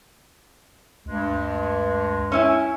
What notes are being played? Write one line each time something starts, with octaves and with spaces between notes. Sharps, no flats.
D2 G2 G#3
C#4 E4 G#5